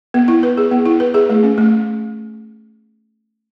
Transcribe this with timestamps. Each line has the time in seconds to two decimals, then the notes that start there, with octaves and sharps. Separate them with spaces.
0.14 B3
0.28 E4
0.43 B4
0.57 G#4
0.71 B3
0.85 E4
1.00 B4
1.14 G#4
1.30 A3
1.43 C#4
1.58 A3